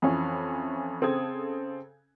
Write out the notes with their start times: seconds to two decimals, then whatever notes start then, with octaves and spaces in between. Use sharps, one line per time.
0.02 F2 E3 C#4
1.01 C#3 C4 A4 D#6 G#6